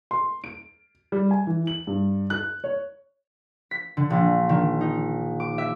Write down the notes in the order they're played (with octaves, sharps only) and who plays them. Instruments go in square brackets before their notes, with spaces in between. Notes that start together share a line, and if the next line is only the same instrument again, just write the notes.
[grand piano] C6
D7
G3
G#5
E3
F#7
G2
F#6
C#5
[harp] B6
D3
A#1
D#3
D#4
D6
E5